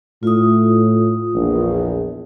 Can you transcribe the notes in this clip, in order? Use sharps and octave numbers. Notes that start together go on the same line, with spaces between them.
A2 F4 D#6
A#1 E2